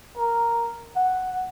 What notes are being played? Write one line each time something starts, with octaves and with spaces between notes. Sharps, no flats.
A#4
F#5